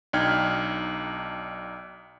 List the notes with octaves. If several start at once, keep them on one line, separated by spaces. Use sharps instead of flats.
B1 D4 D#4 G5 F6 G#6